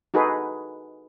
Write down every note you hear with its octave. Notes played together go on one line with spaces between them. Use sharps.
D#4 F#4 G#4 A4 B4